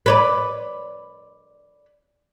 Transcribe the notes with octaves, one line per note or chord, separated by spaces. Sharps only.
B4 C#5 D5